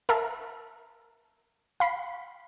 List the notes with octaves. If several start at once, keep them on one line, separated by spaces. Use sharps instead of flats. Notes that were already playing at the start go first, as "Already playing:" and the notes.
A#4 E5 F5 A5
F5 B5 C7